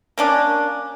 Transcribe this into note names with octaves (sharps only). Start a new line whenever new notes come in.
A#3 C#4 D4